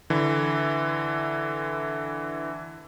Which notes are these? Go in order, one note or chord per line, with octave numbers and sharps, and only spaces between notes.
D3 E3